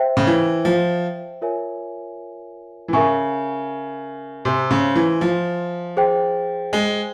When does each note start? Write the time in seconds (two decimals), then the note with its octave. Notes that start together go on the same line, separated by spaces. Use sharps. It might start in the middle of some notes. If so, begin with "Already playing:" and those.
Already playing: C5 E5 G5
0.17 C#3
0.27 E3
0.65 F3
1.42 F4 A#4 C#5 E5 G#5
2.88 E3
2.93 C#3 A#4 E5 G#5 C#6
4.45 C3 C5 E5 G#5 C6
4.71 C#3
4.96 E3
5.21 F3
5.97 G#4 C5 G5
6.73 G#3